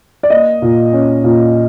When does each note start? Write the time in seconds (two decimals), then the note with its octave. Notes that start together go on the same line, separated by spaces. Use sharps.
0.23 D5
0.30 A#3 D#5
0.62 A#2
0.93 C#4
1.24 A#2